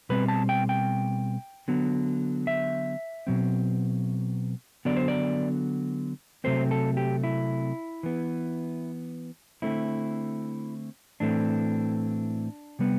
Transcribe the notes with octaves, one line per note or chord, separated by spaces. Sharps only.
B2 G3 C4 B4
A5
G5
G5
D3 F#3 B3
E5
B2 F#3 C4
D3 F#3 B3 D5
C5
D5
C3 F#3 A3 C4 C5
A4
G4
E4
E3 B3
D3 A3 C4 E4
A2 E3 A3 C4 D4
C3 G3 B3